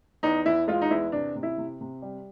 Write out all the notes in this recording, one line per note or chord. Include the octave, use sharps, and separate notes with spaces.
E2 D#4
E2 E4
G#3 F4
D#4
E2 E4
C3 D4
C3
E4
C3
C3
G3